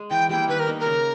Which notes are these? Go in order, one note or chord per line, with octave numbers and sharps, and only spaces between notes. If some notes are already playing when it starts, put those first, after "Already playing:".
Already playing: G#3
E3 G5
G3 A#3 E4 G5
D#3 B4
A#4
A#3 D#4
A#4
C#3